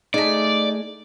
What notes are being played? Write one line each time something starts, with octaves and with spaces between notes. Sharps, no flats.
G#3 A3 D#4 D5